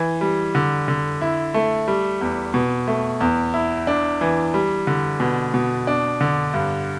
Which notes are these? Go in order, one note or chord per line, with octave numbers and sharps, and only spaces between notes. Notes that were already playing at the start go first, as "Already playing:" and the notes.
Already playing: E3
G3
D3
D3
E4
A3
G3
E2
B2
A3
E2
E4
D4
E3
G3
D3
B2
B2
D4
D3
G2